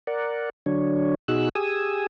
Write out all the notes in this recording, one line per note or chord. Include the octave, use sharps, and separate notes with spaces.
A#4 D5 F#5
D3 F#3 D4 C#5
B2 D#4 F#4 G#4 E6 F#6
G4 G#4 G#5 D#6 E6